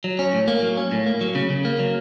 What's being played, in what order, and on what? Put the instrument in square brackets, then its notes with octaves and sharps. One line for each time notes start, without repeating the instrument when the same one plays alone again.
[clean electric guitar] F#3
C#4
A2
A#3
F#3
C#4
A2
A#3
F#3
C#3
C#3
A#3
F#3